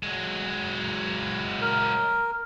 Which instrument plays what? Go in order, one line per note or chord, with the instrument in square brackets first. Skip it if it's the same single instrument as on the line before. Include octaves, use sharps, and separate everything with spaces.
[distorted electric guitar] F#3 G#3
[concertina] A#4